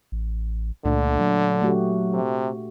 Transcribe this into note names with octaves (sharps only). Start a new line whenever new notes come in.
A1
C#2 A#2 D3 A3 D4
F#3
A3 F#4 G4
C3